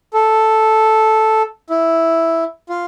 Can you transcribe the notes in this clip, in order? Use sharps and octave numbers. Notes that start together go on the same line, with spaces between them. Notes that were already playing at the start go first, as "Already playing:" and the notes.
A4
E4
F4